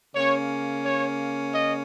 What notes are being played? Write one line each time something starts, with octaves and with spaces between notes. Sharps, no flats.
C#3 A#3 C#4 C#5
C#5
D#5